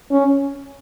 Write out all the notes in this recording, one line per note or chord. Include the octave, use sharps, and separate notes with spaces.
C#4